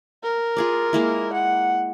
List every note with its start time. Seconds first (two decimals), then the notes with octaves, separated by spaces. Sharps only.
0.24 A#4
0.57 F4 G#4 D5
0.93 G#3 A#3 E4
1.33 F#5